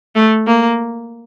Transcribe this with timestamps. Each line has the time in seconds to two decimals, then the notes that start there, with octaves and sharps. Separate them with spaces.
0.16 A3
0.47 A#3